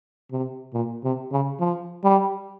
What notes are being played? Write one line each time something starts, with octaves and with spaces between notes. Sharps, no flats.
C3
A#2
C3
C#3
F3
G3